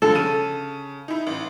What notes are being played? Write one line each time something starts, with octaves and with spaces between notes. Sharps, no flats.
G2 D3 F3 A4
C#3 D#7
D#4 E4
A1